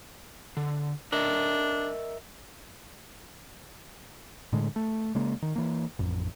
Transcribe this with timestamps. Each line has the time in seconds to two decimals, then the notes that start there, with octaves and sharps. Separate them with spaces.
0.57 D3
1.13 D4 A#4 D#5 E5
4.53 A2 D3 G#3
4.76 A3
5.15 C#3 G#3 A#3
5.42 D#3
5.56 E3 A#3
5.99 A1 F2 B2